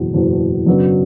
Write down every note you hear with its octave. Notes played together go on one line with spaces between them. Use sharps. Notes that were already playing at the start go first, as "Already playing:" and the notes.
Already playing: F#1 E2 B2
F#1 E2 B2
F#2 C#3 F#3 B3 D4